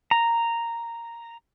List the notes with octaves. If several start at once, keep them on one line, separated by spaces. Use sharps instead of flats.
A#5